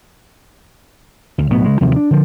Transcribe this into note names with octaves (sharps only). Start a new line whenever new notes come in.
D2
B1 A2 F#3 B3
C#3 G#3
D#2 C3 F3 F#3
D4
D3 F3